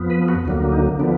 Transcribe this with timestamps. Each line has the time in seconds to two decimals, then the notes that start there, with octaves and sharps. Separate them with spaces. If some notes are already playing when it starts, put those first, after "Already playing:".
Already playing: F2 F3 B3
0.10 B4
0.28 F#4
0.45 D2 D3 F#3 A#3
0.72 D#4
0.99 D3 F3 B3 D4